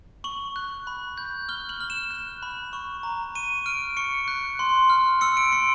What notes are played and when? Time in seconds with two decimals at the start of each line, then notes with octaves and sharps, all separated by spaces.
0.24 C#6 F#7
0.56 F#6
0.87 B5
1.18 G6
1.49 F6 G7
1.69 F#7
1.80 F6
1.90 E7
2.11 F#6
2.42 B5
2.73 C#6
3.03 A#5
3.35 C#6 D#7
3.66 F6 D7
3.97 C#6 C#7
4.28 F#6
4.59 C6
4.90 F6
5.21 E6 C#7
5.37 D7
5.52 C6 C#7